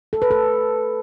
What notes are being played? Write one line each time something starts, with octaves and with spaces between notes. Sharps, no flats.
A4
B4
A4